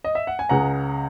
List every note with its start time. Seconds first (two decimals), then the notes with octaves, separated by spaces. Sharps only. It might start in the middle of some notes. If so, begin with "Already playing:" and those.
0.05 D#5
0.15 E5
0.27 F#5
0.39 G#5
0.49 C#2 C#3 G#3 F#5 A#5